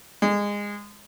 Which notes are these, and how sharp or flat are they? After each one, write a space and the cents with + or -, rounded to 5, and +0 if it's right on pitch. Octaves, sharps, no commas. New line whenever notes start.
G#3 -20